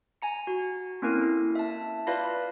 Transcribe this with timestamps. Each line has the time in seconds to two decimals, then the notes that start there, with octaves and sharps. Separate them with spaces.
0.22 G#5 A#5 C#7
0.47 F#4
1.02 A#3 C4 C#4 E4 A4 A#4
1.21 E4
1.55 E5 A5
2.07 F4 B4 D5 F5 B5 A#6